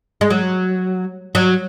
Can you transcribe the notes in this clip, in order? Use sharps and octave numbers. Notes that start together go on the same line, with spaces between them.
G#3
F#3
F#3